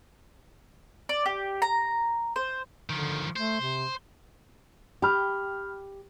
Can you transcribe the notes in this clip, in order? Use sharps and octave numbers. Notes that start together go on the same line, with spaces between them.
D5
G4
A#5
C5
D3 D#3 F3
A3 C5
C3
G4 G5 B5 F6